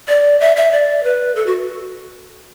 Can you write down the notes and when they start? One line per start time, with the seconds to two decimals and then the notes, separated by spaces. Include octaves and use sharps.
0.08 D5
0.40 E5
0.56 E5
0.72 D5
1.04 B4
1.36 A4
1.46 F#4